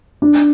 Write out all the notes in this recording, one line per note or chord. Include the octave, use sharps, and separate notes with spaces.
D4